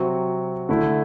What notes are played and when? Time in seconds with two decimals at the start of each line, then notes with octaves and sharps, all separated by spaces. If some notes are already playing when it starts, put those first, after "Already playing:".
Already playing: C3 F#3 C4 F#4
0.69 D3 A3 E4